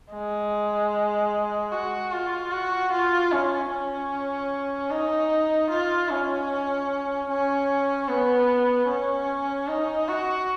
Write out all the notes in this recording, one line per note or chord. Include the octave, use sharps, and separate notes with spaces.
G#3
F#4
F4
F#4
F4
C#4
C#4
D#4
F4
C#4
C#4
B3
C#4
D#4
F#4